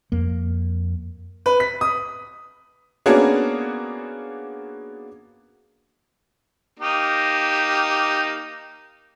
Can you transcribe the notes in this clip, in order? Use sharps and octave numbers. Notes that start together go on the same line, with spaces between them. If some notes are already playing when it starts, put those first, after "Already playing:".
F2 A#3
B4
B6
D#6
A#3 B3 C#4 D4 F#4 G#4
A#3 D#4 G4